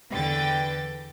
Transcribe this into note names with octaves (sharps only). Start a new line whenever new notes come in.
E2 D3 B4 G5 A6